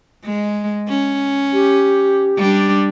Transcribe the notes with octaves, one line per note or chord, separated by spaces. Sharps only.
G#3
C#4
G4
G3 D4